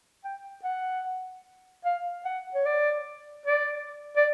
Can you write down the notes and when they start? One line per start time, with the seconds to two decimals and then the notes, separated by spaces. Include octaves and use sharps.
0.24 G5
0.64 F#5
1.85 F5
2.25 F#5
2.54 C#5
2.65 D5
3.46 D5
4.17 D5